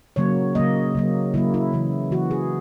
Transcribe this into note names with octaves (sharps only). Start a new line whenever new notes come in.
C#3 F#3 A#3 C#5
C#3 F#3 A#3 D#5
C#3 F#3 A#3
C#3 F#3 A#3 E4
E4
C#3 E3 A#3
C#3 E3 A#3 F#4
G#4